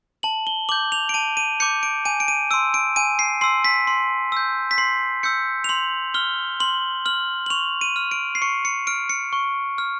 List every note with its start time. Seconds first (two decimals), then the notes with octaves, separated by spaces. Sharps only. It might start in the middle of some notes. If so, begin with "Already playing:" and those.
0.23 A5 F#7
0.47 G7
0.69 D6 G6 F#7
0.92 F7
1.09 D7
1.14 A5 D#7
1.37 D#7
1.60 D6 G6 C#7
1.83 D7
2.05 G#5 D#7
2.20 D7
2.28 D#7
2.51 C6 E6 D7
2.74 D7
2.96 G#5 D#7
3.19 C7
3.41 C6 E6 C7
3.64 B6
3.87 C6
4.32 E6 G6
4.71 B6
4.78 C6 C7
5.23 E6 G6 C#7
5.64 F7
5.69 C6 F#7
6.14 F6 G7
6.60 C6 F#7
7.05 F6 F#7
7.46 F#7
7.50 C#6 F7
7.81 D#7
7.96 F6
8.11 D7
8.35 C7
8.42 C#6 C#7
8.65 C#7
8.87 F6 D7
9.09 C#7
9.33 C#6
9.78 F6